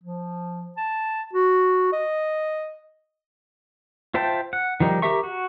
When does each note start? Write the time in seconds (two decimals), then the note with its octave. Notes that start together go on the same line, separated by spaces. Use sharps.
0.03 F3
0.77 A5
1.33 F#4
1.93 D#5
4.14 F4 C5 E5 G5 A5
4.53 F#5
4.80 D#3 F3 G3 D#4
5.02 G4 A#4 E5 C#6
5.23 F#4